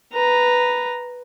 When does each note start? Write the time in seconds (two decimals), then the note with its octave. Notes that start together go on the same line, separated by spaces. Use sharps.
0.14 B4 A#5